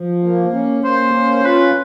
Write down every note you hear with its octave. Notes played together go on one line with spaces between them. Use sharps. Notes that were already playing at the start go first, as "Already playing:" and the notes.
Already playing: F3
A#3
C#4
A#3 C5
C#4
F4 B4